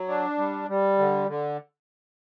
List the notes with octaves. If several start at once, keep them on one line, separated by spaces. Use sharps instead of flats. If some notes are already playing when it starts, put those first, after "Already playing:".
Already playing: F#3
D4
G3
G3
D3
D3